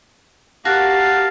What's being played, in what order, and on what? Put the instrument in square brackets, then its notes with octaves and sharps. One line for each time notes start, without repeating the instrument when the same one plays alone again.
[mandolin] F#4 [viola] G4 A#4 [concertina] F5 A5